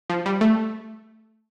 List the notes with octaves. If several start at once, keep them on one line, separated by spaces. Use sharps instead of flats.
F3
G3
A3